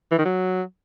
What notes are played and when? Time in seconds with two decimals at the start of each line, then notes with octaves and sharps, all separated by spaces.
0.11 E3
0.18 D#3
0.25 F#3